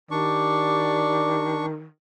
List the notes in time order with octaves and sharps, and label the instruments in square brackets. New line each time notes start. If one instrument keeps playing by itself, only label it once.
[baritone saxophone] D#3 [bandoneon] D4 C#6 [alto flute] G4 [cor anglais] D5